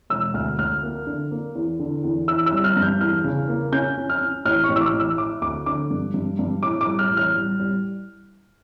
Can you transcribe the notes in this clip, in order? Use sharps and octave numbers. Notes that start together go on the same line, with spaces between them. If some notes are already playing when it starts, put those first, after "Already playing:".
E1 E6
D2 F6
D2 F6
A#3
D3
A#3
E2
D3
E2
E3 E6
E6
G3
F6
G2
G6
E2 F6
C#3
A#3
C#4 G6
C#4
F6
C#4
A1 F6
C#6
A1
E6
D6
A1
E6
E4 D6
D2 D6
D3 D6
G2
G2
G2
A2 D6
D6
G3
F6
A1
F6
G3
G3